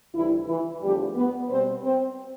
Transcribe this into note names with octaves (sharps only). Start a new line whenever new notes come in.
D2 C3 E3 G3 E4
E3 E4
E2 D3 F3 G3 A3 G4
B3 B4
B2 G3 C4 C5
C4 C5